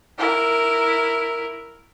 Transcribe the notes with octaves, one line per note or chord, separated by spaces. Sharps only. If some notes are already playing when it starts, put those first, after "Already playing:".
E4 A#4